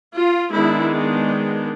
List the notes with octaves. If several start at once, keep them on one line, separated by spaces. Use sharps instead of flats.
F4
D#3 G#3 B3 D4 E4